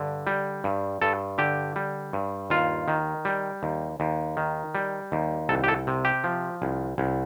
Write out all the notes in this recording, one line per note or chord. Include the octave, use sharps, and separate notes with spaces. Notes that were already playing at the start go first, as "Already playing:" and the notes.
Already playing: G2 D3
G3
G2
G2 A4
D3 G4
G3
G2
D#2 F4
D#3
G3
D#2
D#2
D#3
G3
D#2
C2 A4
G4
A4
C3
G4
F3
C2
C2